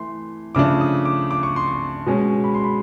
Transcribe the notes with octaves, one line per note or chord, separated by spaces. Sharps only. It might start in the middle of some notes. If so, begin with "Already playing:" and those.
Already playing: E3 A3 C6
C#3 F3 A3 D4 D6
D#6
D6
D6
C#6
C6
C#6
B2 G#3 C#4
B5
C6
B5